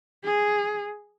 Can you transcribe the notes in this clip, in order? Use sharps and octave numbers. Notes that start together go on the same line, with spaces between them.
G#4